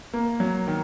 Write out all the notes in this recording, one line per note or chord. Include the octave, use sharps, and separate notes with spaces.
A#3
F#3
D#3